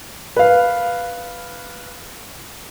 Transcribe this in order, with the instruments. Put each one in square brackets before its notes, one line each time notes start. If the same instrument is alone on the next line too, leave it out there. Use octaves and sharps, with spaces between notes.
[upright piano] B4 F5